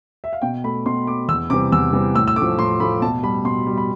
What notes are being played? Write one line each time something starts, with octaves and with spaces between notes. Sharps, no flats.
E5
F5
B2 G5
A3 B5
B2 C6
A3 D6
E2 E6
C3 E3 G3 D6
E2 E6
C3 E3 G3
A2 E6
E6
A3 D6
F3
A2 C6
F3 A3 B5
B2 A5
G3 B5
B2 C6
G3
B5